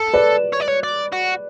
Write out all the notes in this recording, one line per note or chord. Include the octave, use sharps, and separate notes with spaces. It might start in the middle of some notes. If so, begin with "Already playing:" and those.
Already playing: A4
B4 D5
C#5
D5
C#5
D5
F#4